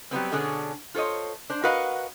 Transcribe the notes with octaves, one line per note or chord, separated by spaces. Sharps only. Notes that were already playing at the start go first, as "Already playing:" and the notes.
F#3 G3 B3 C4
B2 D3 B3 C#4 D4 G#4
F4 A4 C5 C#5 D#5
D4 C5
F#4 A#4 B4 D#5 F5 F#5